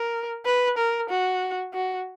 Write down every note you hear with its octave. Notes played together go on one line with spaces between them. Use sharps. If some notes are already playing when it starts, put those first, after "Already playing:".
Already playing: A#4
B4
A#4
F#4
F#4